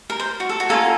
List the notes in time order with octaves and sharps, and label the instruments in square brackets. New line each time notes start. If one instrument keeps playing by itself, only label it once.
[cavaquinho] A#4
C5
F#4
A4
F#4
[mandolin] A#3 C#4 F4 [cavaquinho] A4